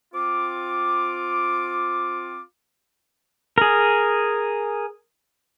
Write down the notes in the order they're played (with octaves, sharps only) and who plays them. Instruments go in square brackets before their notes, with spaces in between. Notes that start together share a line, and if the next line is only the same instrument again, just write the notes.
[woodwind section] C4 F4 D6
[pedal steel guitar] G#4 A#4